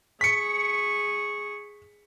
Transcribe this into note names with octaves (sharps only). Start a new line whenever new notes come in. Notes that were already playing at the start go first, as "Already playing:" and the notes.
G#4 C#6 B6 C#7